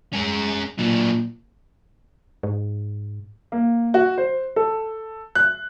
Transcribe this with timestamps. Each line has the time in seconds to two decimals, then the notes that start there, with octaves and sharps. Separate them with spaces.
0.13 G#3 C#4 A#4
0.79 A#2 F#3 D4
2.43 G#2
3.52 A#3
3.94 F#4
4.18 C5
4.56 A4
5.35 F#6